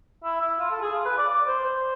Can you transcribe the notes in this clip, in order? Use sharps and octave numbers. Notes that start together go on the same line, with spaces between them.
E4
E4
F4
A4
G#4
F4
B4
D5
D5
C5
C5